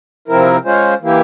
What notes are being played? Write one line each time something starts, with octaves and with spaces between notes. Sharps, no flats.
C3 F3 C4 E4 A#4
G#3 C#4 F4 C5
E3 A#3 E4 G4